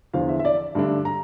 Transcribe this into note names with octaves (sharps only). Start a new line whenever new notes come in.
E2 D3 F3 F5
E5
E5
D5
G2 D3 A3 D4
A#5